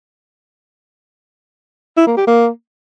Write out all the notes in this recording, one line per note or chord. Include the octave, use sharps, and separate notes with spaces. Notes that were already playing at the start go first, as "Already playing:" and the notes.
E4
A#3
G4
A#3